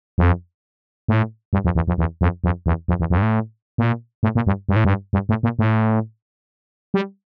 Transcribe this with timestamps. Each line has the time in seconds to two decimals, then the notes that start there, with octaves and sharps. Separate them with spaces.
0.18 F2
1.08 A2
1.53 G2
1.65 F2
1.75 E2
1.88 F2
1.98 E2
2.21 F2
2.44 F2
2.66 E2
2.88 F2
3.00 E2
3.10 F2
3.18 G2
3.22 A2
3.78 A#2
4.23 A2
4.35 A#2
4.47 G2
4.69 G2
4.76 A2
4.85 G2
5.13 G2
5.29 A2
5.43 A#2
5.59 A2
6.94 G3